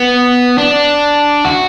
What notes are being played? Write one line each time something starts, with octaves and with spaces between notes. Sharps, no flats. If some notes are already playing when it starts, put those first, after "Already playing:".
Already playing: B3
D4
F#4